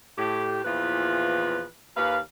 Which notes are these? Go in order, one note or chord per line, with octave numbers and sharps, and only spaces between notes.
A2 G4
E2 A#2 E3 F3 F4 B4
D#2 B4 F5